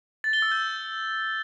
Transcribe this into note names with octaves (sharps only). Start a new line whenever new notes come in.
A6
G7
E6
G6